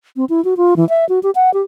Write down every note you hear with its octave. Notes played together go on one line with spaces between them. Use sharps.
C4
E4
F#4
F4
E3
E5
F#4
G4
F#5
G4